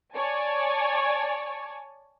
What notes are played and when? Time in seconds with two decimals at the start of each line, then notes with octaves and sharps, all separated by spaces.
0.15 C#5 D5 G#5 A5